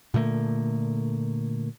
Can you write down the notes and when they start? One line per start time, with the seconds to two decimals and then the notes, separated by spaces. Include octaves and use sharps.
0.14 A#2 D3 A3 A#3